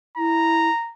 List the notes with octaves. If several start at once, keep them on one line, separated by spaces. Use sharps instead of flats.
E4 A#5